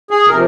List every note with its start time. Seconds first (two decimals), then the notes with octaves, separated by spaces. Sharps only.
0.10 G#4
0.28 C3 F3 A#4